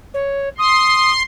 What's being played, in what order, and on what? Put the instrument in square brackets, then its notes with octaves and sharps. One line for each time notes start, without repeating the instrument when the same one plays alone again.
[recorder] C#5
[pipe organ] C6 [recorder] D#6